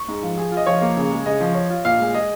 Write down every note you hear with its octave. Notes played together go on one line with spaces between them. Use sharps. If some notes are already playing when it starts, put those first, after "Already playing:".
Already playing: C#6
G#2
F3
G#4
F4
D#5
F3 C#5
A#3
C#3
G#3
C#3 D#5
F3
C#5
F4
A#2 F5
G#3
G#4 D#5